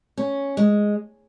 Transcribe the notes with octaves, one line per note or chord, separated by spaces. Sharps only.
C#4
G#3